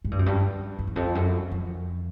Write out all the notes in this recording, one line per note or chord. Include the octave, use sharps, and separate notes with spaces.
G#2
G2
F#2
G2
F#2
E2
F2
F#2
F2